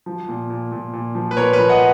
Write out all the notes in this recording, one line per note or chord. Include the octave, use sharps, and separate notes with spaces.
F3
A#2
A#2
A#2
A#2
F3
B4
A#2 A#4 C#5
B4
F3
D#5 F#5